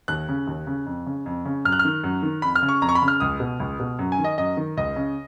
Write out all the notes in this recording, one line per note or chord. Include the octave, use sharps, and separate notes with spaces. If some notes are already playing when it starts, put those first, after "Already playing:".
D#2 F#6
C#3
D#2
C#3
F2
C#3
F2
C#3
F#2 F6
F#6
F6
D#3
F#2
D#3
F2 B5
F6
C#3
C#6
F2 A#5
C#6
B5
C#3
F6
C#2 D#6
B2
C#2
B2
F#2
G#5
D#3
D#5
F#2 D#5
D#3
C#2 D#5
C#3